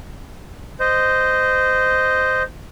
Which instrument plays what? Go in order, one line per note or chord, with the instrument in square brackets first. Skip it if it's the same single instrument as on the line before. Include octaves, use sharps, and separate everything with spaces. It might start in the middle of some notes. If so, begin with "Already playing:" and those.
[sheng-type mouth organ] C5 D#5